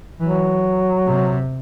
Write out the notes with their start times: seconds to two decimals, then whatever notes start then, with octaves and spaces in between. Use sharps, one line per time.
0.20 E3 F#3
1.07 C3